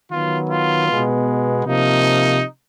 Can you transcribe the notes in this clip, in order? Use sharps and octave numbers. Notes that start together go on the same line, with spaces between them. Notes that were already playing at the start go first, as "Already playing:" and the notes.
D#3 F#3 B3 F4
F4
B2 G#3 B3
C3 F3 A#3 D#4